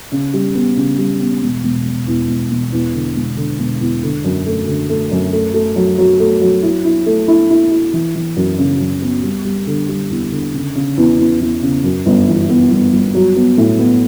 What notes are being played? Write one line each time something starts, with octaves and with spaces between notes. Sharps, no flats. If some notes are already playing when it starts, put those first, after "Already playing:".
C#3
G3
B3
C#3
G3
B3
E1
E1
E1
E2
E1
E1
E2
D3
E1
D3
E1
E2
D3
F#2
A3
D3
A3
F#2
A3
A3
F#3
F#3
A3
F#3
E4
E4
A3
E4
E4
E4
E3
E3
F#2
C#3
F#2
B3
G3
G3
D3
G3
E2
D3
C#3
C#3
E2
E2
E2
C#3
F#2
G1
E3
B3
G1
G1
F#3
B3
A2
B3